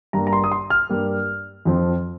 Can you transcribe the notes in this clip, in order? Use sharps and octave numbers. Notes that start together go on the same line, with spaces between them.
G2 G3 A#3 A#5
A#5
C6
D#6
C6
F6
G2 G3 A#3
F2 F3 C4